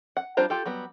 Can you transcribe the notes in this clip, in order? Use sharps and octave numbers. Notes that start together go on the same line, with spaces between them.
F#5
G3 D4 F4 C5 A#5
F4 G4 A4
F#3 G3 B3